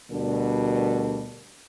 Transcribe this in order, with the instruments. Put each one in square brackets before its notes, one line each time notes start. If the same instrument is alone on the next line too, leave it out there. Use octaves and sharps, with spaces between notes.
[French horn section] D2 B2 D3 G3 D4 A#4